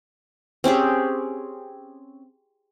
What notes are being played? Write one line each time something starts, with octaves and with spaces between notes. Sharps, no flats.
C4 C#4 G4 G#4